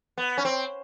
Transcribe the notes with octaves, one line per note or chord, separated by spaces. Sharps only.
B3
C#4
C4